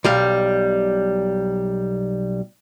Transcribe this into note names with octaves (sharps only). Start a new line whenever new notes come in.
B1 G3 F5